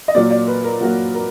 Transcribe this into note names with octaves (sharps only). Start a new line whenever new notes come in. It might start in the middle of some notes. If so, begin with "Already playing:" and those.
D#5
A#2 F#3 A#3 D5
D5
B4
A#4
A#2 F#3 A#3 F#4
A#4